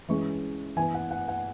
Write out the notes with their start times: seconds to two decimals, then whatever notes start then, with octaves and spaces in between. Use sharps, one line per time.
0.09 E3 G#3 C#4 C#6
0.77 E3 B3 G#5
0.94 F#5
1.11 F#5
1.28 F#5